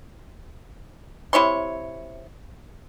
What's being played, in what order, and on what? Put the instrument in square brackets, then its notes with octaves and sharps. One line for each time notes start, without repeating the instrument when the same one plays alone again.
[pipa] C3 E4 C#5 C6